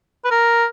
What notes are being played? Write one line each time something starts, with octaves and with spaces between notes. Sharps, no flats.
B4
A#4